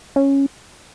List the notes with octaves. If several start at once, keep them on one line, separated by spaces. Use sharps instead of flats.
C#4